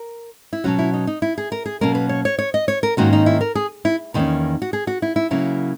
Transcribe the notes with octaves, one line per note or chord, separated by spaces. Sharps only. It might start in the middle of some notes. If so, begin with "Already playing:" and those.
Already playing: A#4
E4
B2 F#3 C#4 F#4
E4
D#4
D#4
E4
G#4
A#4
G#4
B2 F#3 A#3 C#4 A#4
B4
C#5
C#5
C#5
D#5
C#5
A#4
G#2 D#3 A#3 C#4 F#4
D#4
E4
A#4
G#4
E4
E2 D#3 A#3 C#4
F#4
G#4
F#4
E4
E4
C#3 F#3 A#3 C#4 E4